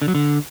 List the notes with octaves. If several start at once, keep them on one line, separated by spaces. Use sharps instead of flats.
D3
F#3
D3